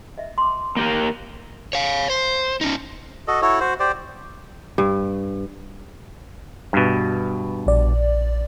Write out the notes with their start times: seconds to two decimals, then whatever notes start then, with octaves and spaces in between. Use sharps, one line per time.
0.18 D#5 E5
0.38 C6 D6
0.77 A#3 G4 A#4
1.73 C#5 F5
2.10 C5
2.61 C#4 D#4
3.28 F#4 A4 D#5
3.42 E4 F#4 A4 C#5
3.60 F#4 C5
3.80 G4 C5 D5
4.78 G2
6.73 G2 B2
7.67 A#1 D5